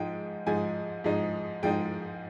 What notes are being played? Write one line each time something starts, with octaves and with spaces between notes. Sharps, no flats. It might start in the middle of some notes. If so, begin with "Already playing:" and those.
Already playing: G#2 F3 G#3 D#4 G5
G#2 F3 G#3 D#4 G#5
G#2 F3 G#3 D#4
G#2 F3 G#3 D#4 G5